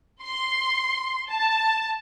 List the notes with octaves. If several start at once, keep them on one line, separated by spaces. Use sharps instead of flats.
C6
A5